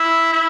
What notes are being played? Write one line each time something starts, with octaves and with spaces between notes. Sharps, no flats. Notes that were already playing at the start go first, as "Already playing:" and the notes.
Already playing: E4
E4